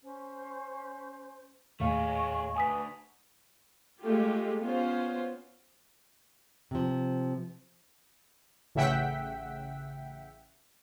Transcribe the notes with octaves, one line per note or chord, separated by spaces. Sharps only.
C#4 C5
D#2 A2 A3 G#4 C#5 D#5 F5 C#6
D2 B4 G#5 D#6 B6
G#3 A3 F4 G4
B3 C#4 F4 C5
C3 F3
A1 C#3 E5 F#5 G5 B6